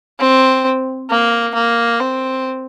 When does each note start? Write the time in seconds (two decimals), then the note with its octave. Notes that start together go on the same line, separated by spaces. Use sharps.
0.19 C4
1.10 A#3
1.55 A#3
2.00 C4